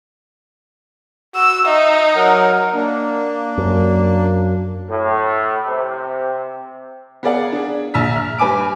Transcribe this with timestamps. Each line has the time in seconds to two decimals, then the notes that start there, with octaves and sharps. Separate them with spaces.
1.35 F#4 E6
1.65 D#4 E5
2.16 F#3 A#4 F#5
2.74 A#3 D4
3.58 F#2
4.89 A2
5.66 C3
7.23 B3 G#4 A#4 D5 F5 F#5
7.52 D4 G#4
7.94 A#1 A#5 E6 B6
8.12 E5 F6
8.38 G2 B4 G#5 D6 D7